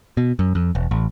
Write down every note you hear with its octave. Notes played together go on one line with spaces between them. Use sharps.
B2
F#2
F2
E1
A1